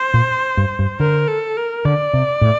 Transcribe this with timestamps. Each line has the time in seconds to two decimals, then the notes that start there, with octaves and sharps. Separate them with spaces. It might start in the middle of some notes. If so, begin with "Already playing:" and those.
Already playing: C5
0.14 A#2
0.57 G2
0.79 G2
1.00 D3 A#4
1.28 A4
1.57 A#4
1.85 D3 D5
2.14 C3
2.41 A2